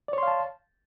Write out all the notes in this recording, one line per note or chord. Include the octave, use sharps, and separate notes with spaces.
C#5 D5 F5 A5 C6